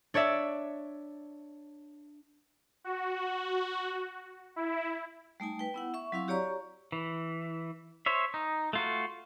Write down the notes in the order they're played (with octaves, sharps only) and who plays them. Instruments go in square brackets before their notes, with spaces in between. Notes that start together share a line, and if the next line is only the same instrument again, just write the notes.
[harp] D4 C#5 D5 E5
[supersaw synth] F#4
E4
[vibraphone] G3 A3 D#4 G#5
B4 G5
B3 E4 F#5
E5 C#6
F#3 C4 E4 F5 C#6
F#4 G4 C#5 D5 A#5 C#6
[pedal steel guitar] E3
C5 C#5 E5
D#4
A3 F4 F#4